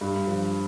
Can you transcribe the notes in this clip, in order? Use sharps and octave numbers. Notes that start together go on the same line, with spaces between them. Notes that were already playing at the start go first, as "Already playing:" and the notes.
G2
F3